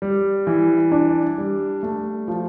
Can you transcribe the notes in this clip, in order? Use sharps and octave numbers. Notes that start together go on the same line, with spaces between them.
G3
E3
D4
G3
A3
F3